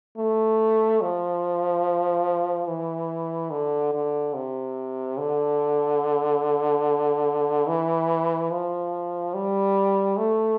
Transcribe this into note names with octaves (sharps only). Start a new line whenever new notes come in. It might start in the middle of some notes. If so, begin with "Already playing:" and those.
A3
F3
E3
D3
D3
C3
D3
E3
F3
G3
A3